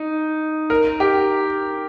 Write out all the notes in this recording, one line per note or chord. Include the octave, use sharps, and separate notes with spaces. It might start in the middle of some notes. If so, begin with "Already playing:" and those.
Already playing: D#4
A#4
G4